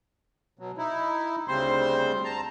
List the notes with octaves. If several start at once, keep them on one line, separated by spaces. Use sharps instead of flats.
B2 F#3
D#4 E4
D2 C#3 G3 C4 C5 C6
A5 A#5